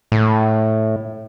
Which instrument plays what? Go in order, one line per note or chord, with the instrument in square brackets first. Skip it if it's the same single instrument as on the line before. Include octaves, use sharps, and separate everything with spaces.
[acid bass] A2